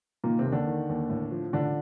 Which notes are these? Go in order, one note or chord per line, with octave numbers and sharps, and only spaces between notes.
A#2 D#3 A#3
C3 C4
D#2
D3 D4
D#3
D#2
A2
F3
A1 D3 D4